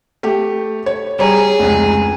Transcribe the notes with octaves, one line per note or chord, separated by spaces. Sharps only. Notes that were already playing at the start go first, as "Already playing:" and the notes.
A3 G4
C#5
G3 G#4 C#5 A#5
F1 C#2